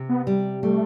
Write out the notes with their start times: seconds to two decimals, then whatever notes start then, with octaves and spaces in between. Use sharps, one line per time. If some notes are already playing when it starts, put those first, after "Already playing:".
Already playing: C3
0.09 B3
0.27 G3
0.63 G3 A3